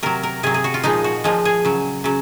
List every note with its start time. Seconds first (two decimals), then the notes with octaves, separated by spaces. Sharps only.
0.03 C3 F#3 A#4
0.23 A#4
0.43 C3 F#3 G#4
0.54 G#4
0.64 F#4
0.74 F4
0.83 A#2 F3 G#3 D#4
1.04 F#4
1.24 A#2 F3 G#3
1.45 G#4
1.65 C#3 F#3
2.04 C#3 F#3